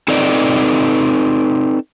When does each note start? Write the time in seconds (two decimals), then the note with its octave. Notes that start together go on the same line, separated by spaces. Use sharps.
0.08 C4 D#4 A4 B4 D5 D#5